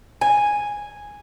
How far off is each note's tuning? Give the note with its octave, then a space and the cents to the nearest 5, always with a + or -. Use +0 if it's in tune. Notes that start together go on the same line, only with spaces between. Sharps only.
G#5 -5